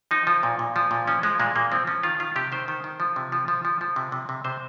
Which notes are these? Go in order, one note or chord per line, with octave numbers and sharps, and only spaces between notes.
F3 D#4
F3
A#2
A#2
F3
A#2
F3 C#4
F3 G#3
A#2 G#3
A#2 A#3
F3 C4
F3 C#4
D#3 F4
D#3 F4
C3 G4
D#3 C5
D#3
D#3
F3
C3
F3
F3
F3
F3
C3
C3
C3
C3 C5